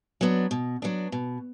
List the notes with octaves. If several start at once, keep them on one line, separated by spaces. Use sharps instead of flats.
F#3 B3 D4
B2
F#3 B3 D4
B2